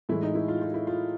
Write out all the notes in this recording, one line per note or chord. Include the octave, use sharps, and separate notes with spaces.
A2 E3 G#3 E4
D#4
E4
F4
F4
E4
F4